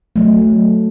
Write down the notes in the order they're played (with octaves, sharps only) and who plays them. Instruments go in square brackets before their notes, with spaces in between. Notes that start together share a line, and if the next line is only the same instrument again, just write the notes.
[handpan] F#3 A3